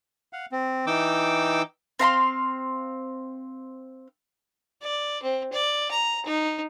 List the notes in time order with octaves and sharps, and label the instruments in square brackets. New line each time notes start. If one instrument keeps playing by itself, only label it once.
[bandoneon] F5 F#5
C4
E3 D#4 G5 D6 E6
[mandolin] C4 F5 A#5 C6
[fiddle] D5
C4
D5
A#5
D#4